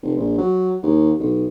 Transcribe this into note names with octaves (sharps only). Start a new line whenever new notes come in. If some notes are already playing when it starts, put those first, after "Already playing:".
F1
A#1
F#3
D#2
B1